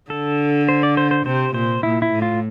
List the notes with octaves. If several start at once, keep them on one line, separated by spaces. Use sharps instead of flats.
D3 A4
C5
D5
C5
C5
C3 C5
A#2 C5
A#2 E4
E4
A2
F4